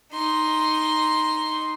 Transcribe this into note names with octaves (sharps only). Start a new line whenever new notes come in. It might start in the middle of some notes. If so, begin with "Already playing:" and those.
D#4 C6